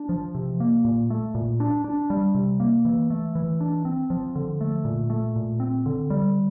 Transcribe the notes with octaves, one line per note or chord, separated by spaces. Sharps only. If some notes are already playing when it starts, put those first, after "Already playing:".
Already playing: D4
F3
C3
A#3
A#2
A3
A#2
D4
D4
G3
C3
A#3
E3
A3
E3
D4
C4
F3
D3
A3
A#2
A3
A#2
C4
D3
G3